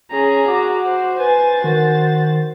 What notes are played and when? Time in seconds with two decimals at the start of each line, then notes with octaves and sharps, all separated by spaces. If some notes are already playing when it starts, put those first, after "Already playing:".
0.11 C#4 G#4 A#5
0.48 F#4 D6
0.86 C5
1.19 B4 C5 G#5 A6
1.64 D#3 F#4